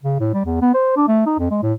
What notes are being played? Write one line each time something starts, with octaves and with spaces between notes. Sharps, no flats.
C#3
A2
G3
E2
B3
C5
D4
A3
D#4
F2
G#3
A2